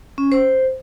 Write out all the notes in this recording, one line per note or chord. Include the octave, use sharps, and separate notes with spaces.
C#4
C5